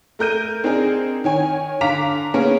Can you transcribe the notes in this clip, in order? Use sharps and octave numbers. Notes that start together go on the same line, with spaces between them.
A3 A#4 G6 D#7
C4 D4 D#4 G#4 A#4
D#3 C#5 G#5
D3 F5 A#5 D6 B6 F7
A#3 B3 C#4 G#4 A#4